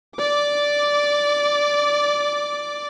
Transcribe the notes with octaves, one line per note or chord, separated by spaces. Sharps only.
D5 D6